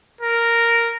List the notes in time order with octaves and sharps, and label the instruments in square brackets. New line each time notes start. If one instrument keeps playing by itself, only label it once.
[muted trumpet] A#4